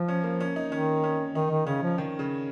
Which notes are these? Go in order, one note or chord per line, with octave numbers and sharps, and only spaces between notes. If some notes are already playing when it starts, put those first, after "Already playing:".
Already playing: F3
C#4
A#3
C#4
D#4
D#3 C#4
C#4
D#3 D#4
D#3
C#3 C#4
F3
D#3
C#3